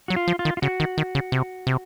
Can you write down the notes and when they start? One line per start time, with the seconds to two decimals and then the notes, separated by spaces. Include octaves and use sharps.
0.08 F#3 F#4
0.16 F4
0.28 F3
0.39 F4
0.45 D#3
0.57 F4
0.62 C#3 F#4
0.80 D#3
0.98 D#3
1.15 C#3
1.32 C3
1.67 C3